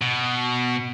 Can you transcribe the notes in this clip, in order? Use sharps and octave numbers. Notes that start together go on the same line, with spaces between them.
B2